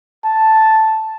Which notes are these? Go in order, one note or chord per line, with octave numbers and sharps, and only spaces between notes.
A5